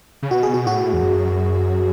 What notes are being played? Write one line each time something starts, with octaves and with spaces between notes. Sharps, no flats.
C#3
B2 F#4
G#4
F#4
A2 F#4
E2
F#2